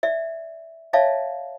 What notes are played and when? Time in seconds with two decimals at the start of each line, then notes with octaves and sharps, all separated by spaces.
0.03 D5 E5
0.93 C#5 D5 E5 F5 A5